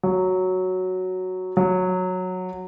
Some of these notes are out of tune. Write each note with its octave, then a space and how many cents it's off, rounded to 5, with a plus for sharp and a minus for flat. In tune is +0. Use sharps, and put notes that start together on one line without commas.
F#3 +0
F#3 -10